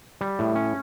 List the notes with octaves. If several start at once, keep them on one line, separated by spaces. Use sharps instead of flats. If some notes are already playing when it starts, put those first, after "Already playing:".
G3
A2
C#4